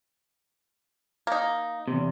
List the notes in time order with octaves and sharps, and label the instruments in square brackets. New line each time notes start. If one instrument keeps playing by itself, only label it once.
[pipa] A#3 D#4
[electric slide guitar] E2 C3